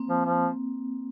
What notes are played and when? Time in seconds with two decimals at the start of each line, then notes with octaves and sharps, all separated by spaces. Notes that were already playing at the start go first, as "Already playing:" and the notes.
Already playing: A#3 C4
0.09 F3
0.25 F3